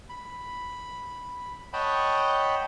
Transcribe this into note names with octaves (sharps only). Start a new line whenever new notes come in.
B5
C#5 D#5 F#5 G5 A5 B5